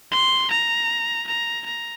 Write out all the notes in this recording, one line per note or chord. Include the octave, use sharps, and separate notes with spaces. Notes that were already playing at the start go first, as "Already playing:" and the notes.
C6
A#5
A#5
A#5